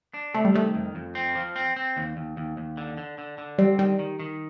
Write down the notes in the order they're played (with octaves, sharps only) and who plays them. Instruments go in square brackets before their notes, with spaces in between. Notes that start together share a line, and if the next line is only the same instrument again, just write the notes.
[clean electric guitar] D4
[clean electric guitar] C3 [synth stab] A3
[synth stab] G3
[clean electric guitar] D#3 [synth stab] A3
[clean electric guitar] F2
F2
C4
F3
C4
C4
D#2
D#2
D#2
D#2
D3
D3
D3
D3
[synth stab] G3 [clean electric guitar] C4
[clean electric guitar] D#3 [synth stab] G3
[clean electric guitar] D#3
D#3